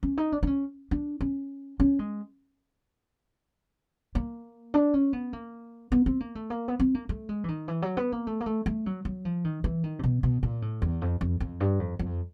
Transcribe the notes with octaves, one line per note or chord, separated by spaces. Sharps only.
C#4
D#4
D4
D4
C#4
D4
C#4
C#4
G#3
A#3
D4
C#4
B3
A#3
B3
C4
A#3
A3
A#3
B3
C4
A#3
A3
G#3
E3
D#3
E3
F#3
B3
A#3
A3
A#3
A3
A3
F#3
F#3
F3
D#3
E3
D#3
C3
B2
B2
A#2
A2
E2
F2
F2
F2
G2
F2
F2